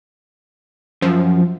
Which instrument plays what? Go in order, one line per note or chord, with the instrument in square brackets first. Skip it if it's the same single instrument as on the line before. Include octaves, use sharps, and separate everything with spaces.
[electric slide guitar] F#2 [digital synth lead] F3